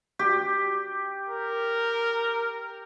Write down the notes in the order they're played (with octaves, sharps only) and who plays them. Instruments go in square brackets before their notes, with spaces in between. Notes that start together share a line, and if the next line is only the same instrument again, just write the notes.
[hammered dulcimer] G4
[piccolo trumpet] A#4